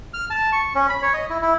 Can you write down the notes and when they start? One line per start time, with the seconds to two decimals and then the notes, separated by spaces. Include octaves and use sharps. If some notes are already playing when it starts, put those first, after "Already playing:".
0.14 F6
0.30 A5
0.52 C#6
0.75 C#4
0.89 B5
1.02 C#5
1.14 D#5
1.30 E4
1.42 E4